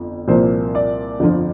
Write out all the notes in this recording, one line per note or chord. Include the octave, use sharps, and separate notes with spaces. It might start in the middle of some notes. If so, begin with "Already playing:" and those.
Already playing: G1 F2
C2 A#2 F3 A#3 C5
D5
G1 F2 D3 F3